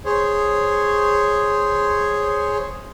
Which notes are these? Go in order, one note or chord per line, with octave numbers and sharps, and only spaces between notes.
G#4 C5 C#5